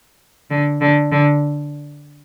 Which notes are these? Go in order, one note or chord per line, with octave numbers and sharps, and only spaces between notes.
D3
D3
D3